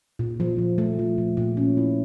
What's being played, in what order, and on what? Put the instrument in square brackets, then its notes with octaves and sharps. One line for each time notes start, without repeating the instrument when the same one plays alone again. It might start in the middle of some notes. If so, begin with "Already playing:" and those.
[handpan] A#2
F3
A#2
A3
F3
A#2
A#2
C#4
E4